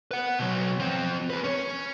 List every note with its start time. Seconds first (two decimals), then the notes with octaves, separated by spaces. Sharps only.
0.11 B4 F#5
0.39 B2 F#3
0.79 F3 C4
1.30 G#4 B4
1.44 C#4 C#5